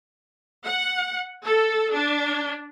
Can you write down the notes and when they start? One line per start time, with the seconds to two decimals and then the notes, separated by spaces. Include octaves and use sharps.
0.66 F#5
1.45 A4
1.93 D4